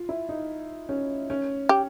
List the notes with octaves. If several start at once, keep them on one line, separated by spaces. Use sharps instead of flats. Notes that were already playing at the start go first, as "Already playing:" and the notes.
Already playing: F4
E4
D#4
C#4
C#4
G4